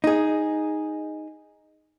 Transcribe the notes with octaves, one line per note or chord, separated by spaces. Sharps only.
D#4 G#4